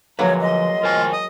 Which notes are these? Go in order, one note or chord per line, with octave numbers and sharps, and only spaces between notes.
F3 F#3 G#3 A#3 B4 C#5 A#5
D#5 C6
F4 A#4 C5 G#5
D#5